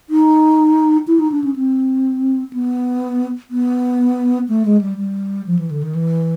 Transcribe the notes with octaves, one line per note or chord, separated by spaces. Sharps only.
D#4
E4
D#4
D4
C#4
C4
B3
B3
A3
G#3
G3
G3
F3
E3
D3
D#3
E3